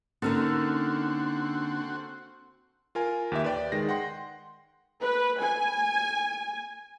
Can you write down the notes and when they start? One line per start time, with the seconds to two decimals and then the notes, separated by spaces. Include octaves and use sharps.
0.22 D3 A#3 C4 C#4 D#4 F#4 A4 A#4
2.95 F4 A#4 G#5
3.32 D#2 G4 E5
3.44 B4 D5 G5
3.72 D#3 G#3 A#6
3.89 F#5 G5 C6
5.01 B4
5.41 G#5